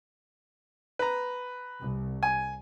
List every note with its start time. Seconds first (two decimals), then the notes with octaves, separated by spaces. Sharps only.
0.99 B4 A#5
1.80 C2
2.23 G#5